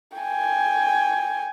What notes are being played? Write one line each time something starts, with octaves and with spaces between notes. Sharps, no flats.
G5 G#5